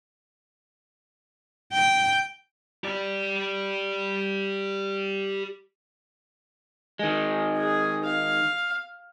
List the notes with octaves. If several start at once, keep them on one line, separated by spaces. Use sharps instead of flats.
G5
G4 D5
D#3 G#3
G#4
F5